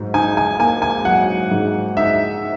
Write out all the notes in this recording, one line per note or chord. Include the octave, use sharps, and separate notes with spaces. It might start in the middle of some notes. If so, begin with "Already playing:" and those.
Already playing: G#2 F#3
D#4 G#5
G#5
A#3 G#5
G#5
F#3 F#5
G#2
D#4 E5